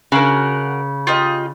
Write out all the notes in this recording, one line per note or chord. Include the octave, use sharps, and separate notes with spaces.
C#3 F#4 A#4
F4 G4 D#5